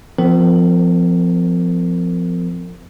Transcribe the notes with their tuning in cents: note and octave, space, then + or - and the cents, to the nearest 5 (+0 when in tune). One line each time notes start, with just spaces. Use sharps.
F3 +0 C4 -40 A4 +45